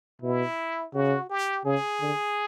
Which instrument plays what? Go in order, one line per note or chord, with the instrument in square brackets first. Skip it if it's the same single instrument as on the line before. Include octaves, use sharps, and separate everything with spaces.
[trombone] B2 [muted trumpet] E4
[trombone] C#3 [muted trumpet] F#4
[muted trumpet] G4
[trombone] C#3 [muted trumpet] G#4
[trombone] D3